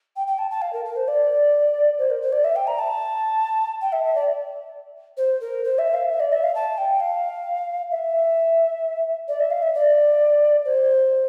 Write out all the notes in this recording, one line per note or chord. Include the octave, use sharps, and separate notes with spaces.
G5
G5
A5
A5
F5
A#4
A#4
C5
D5
C5
A#4
C5
D5
E5
G5
A#5
A5
G5
E5
E5
D5
C5
A#4
C5
E5
F5
E5
D5
E5
F5
A5
G5
F5
E5
D5
E5
F5
E5
D5
C5